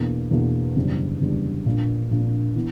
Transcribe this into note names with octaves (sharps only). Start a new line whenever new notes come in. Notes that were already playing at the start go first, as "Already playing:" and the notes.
Already playing: E2 B2 A#3 D4
E2 B2 A#3 D4
F#1 E2 D3 G3
F#1 E2 D3 G3
A#1 A#2 A#3 D4
A#1 A#2 A#3 D4
E3 B3